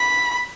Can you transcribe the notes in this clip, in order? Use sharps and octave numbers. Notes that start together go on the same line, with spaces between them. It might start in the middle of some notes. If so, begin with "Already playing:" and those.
Already playing: B5